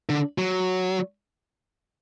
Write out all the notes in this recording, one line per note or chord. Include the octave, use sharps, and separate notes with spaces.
D3
F#3